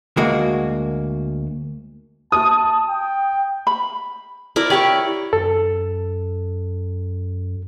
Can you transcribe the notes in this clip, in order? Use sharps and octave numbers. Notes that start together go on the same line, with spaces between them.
D2 G#3 A#3 F#4
A5 D#6
G5
B5
E4 A#4 D5
G4 C#5 D5 C#6
F#2 A4